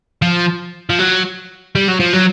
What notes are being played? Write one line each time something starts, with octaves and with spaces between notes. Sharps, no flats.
F3
F3
F#3
G3
F#3
F3
F#3